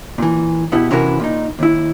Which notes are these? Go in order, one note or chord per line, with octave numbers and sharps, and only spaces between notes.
A#2 E3
B2 B3 E4 G4
C3 E3 C#4 E4 F#4 A#4
A#2 D#4
D#2 E4